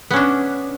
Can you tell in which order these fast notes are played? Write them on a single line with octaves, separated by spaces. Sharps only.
B3 C#4 D4